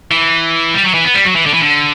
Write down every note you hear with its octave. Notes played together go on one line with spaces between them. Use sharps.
E3
G3
F#3
E3
B3
G3
F#3
E3
D3
E3
D3